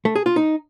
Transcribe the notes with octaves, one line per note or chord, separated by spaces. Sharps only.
A3
G#4
F4
D#4